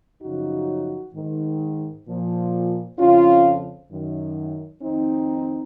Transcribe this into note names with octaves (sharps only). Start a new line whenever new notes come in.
F#2 C#3 F3 D#4 F#4
G#2 D#3
A#2 F3
F2 C#3 F3 C#4 F4
F#2 D#3
F2 D#3 C4 D#4